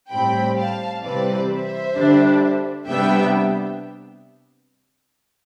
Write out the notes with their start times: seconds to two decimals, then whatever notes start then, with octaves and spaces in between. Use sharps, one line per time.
0.11 A2 G3 C4 G5 B5
0.57 F5 A5
1.03 C3 E3 G3 C4 B4 D5
1.49 C5 E5
1.96 D3 G3 D4
2.88 C3 G3 B3 D4 E5 G5